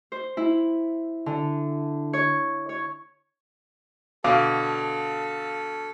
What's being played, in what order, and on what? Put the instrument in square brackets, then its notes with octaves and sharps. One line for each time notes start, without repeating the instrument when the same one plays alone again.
[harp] C5
E4
D3
C#5
C#5
[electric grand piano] B2 D3 D6 [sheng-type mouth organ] A4 [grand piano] F5